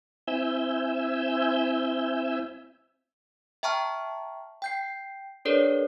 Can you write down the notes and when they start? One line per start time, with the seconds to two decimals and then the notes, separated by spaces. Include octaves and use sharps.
0.28 C4 E4 E5 G#5 E6 G6
3.63 E5 G5 A5 A#5 C#6 F6
4.62 G5 G6 C7
5.45 D4 G#4 A#4 B4 C#5 D5